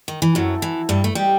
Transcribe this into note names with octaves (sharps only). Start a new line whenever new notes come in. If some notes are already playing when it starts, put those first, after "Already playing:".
D#3
E3
F#2 F#3 A3 C4 F#4 A4
E3
G2 G3
A3
G3 G4 D#5 G5